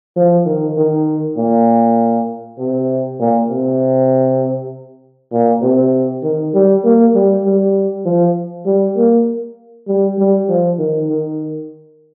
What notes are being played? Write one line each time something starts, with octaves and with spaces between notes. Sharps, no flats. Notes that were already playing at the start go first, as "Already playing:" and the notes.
F3
D#3
D#3
A#2
C3
A#2
C3
A#2
C3
D#3
G3
A#3
G3
G3
F3
G3
A#3
G3
G3
F3
D#3
D#3